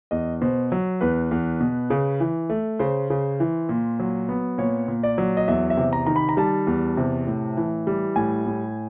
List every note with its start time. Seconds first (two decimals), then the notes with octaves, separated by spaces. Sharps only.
0.11 E2 D#5
0.41 B2 C5
0.72 F#3
1.01 E2 B4
1.31 E2
1.61 B2
1.90 C#3
2.20 E3
2.50 A3
2.79 C#3 C5
3.10 C#3
3.40 E3
3.69 A#2
3.99 F#3
4.29 B3
4.58 A#2 C#5
4.88 A#2
5.03 D5
5.18 F#3
5.37 D#5
5.48 E2 E5
5.70 E5
5.77 C3
5.93 A#5
6.07 D#3 A#5
6.16 B5
6.29 A#5
6.37 G3 A5
6.67 E2
6.97 C3
7.27 A2
7.57 E3
7.87 G3
8.16 A2 G#5
8.46 A2